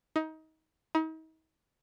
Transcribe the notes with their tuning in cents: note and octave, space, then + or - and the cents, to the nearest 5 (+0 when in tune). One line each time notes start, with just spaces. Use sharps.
D#4 +25
D#4 +40